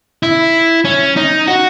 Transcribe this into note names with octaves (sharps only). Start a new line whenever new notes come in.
E4
C#4
D#4
F#4